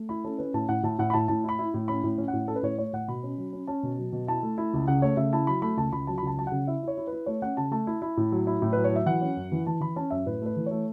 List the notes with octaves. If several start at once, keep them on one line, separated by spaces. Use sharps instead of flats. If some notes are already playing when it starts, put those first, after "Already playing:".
Already playing: A3
E4 B5
C#4 A4
C#4 B4
A2 A5
A2 F#5
A2 A5
A2 F#5
B5
A2 A5
A2 A5
E4 B5
E4
A2
C#4 B5
A2
C#4
F#5
A2
C#4 A4
B4
A2 C#5
A3 C#5
A2 F#5
B2 B5
C#4
F#3
C#4
C#4 A5
B2
F#3
B2
E4 A5
A3
E4
C#2
C#3 F#5
A3 C#5
C#3 E5
E4 A5
F#3 B5
A3 B5
C#2 A5
C#2 B5
F#3 A5
B5
C#2 A5
F#3 A5
C#3 F#5
E4 E5
E4 C#5
E4
B4
E4
A3 C#5
C#4 F#5
C#3 A5
A3 A5
E4
E4
A2
F#3
E4
A2
F#3 B4
C#5
F#3 E5
E3 F#5
C#4
F#2
E3
E3 A5
E3 B5
C#4 A5
F#2 E5
A2 B4
A3 B4
E3
A3 C#5